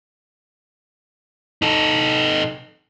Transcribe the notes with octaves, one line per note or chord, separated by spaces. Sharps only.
D#4 A4